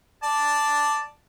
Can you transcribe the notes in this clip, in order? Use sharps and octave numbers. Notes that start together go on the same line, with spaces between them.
D5 A5